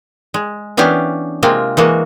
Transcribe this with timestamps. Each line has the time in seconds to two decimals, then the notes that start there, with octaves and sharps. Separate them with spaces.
0.34 G#3
0.77 E3 B3 C#4 D4 G4 F5
1.43 C3 G#3 A#3 C4 F4
1.77 E3 G#3 A#3 F#4